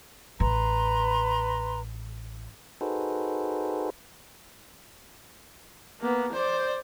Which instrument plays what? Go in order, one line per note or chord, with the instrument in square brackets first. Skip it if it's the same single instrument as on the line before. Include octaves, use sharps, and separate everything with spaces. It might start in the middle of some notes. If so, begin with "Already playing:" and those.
[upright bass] A1 [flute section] B4 A#5 C6
[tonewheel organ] D#4 F#4 G#4 A4 B4 C5
[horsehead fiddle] A#3 B3
C5 D5